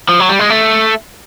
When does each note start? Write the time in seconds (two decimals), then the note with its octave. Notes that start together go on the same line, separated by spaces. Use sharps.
0.09 F3
0.20 F#3
0.29 G3
0.39 G#3
0.50 A3